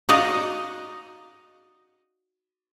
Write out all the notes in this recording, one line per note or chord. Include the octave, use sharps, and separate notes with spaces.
D#4 F#4 D5 D#5 F5